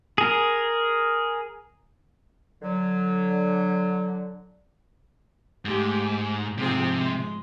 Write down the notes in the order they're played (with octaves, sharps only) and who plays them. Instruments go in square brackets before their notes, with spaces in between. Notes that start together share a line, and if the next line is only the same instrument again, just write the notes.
[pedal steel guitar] G#4 A#4
[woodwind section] D3 F#3
[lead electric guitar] G#2 [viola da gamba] G#3 A3 G4
[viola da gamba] G#3
[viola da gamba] G#2 F3 G#4 [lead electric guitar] C3
[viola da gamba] G#3